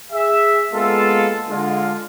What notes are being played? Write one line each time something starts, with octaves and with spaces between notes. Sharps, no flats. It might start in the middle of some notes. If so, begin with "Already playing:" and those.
G#4 E5
G#3 A#3 B3 F4 A4
D3 G#3 F4